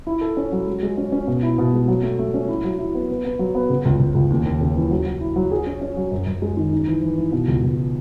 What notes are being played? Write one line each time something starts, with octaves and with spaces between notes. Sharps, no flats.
E4
A4
C#4
F#3
G#3
G#3
C#4
C#4
B2
E4
B2
G#3
F#3
A3
A3
C#4
E4
F#3
E4
B3
B3
B3
F#3
B3
C#3
C#2
C#2
C#2
D#2
D#2
C#3
E3
F#3
F#3
E4
F#3
G#4
C#4
C#4
F#3
F#2
F#2
G#3
D#3
D#4
E3
E3
E3
B2
C#2
C#2